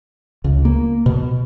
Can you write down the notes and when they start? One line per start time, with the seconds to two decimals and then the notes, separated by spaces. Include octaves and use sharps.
0.44 C#2
0.65 A#3
1.06 B2